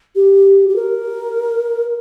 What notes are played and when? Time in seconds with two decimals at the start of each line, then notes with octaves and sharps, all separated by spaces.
0.16 G4
0.69 G4
0.76 A#4